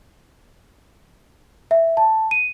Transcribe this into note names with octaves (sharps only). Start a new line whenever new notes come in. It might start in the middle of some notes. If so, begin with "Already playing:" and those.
E5
A5
D#7